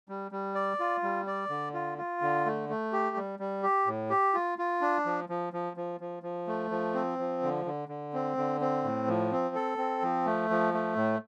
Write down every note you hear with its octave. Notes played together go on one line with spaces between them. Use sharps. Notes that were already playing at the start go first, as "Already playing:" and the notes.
G3
G3
D5
F4
G3
D5
D3
F4
F4
D3
A3
A3
G4
G3
G3
G4
A2
G4
F4
F4
D4
F3
F3
F3
F3
F3
F3
A3
F3
C4
F3
D3
D3
D3
C4
D3
C4
A2
F3
C4
A4
C4
F3
A3
F3
A3
A2